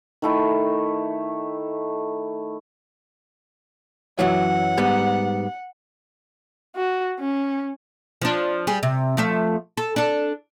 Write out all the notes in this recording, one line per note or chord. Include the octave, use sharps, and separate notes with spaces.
D#3 A3 E4
F#2 E3 F#3 F#5
G#2 G3 B3
F#4
C#4
F3 D4
G3 G#4
C3
F3 A3 E5
A4
D4 A4